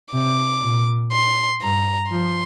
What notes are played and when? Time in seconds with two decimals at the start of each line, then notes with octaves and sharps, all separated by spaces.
0.13 C3 D6
0.63 A#2
1.12 C6
1.62 G2 A#5
2.11 F3 C6